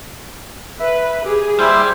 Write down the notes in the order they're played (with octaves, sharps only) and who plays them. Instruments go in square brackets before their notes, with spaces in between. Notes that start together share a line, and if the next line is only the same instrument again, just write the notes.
[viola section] B4 [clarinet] E5
[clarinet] G4 [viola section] G#4
[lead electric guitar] G3 [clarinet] A#3 [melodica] E4 C5